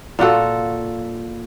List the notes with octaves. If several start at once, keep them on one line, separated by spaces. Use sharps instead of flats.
A#2 F4 F#4 A4